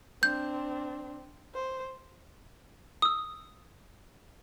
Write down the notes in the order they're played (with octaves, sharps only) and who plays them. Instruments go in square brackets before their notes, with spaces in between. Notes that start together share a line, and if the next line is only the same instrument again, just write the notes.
[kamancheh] C4 D4 [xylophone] G6
[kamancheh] C5
[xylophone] D#6 E6